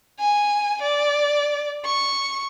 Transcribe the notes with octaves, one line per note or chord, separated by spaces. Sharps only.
G#5
D5
C#6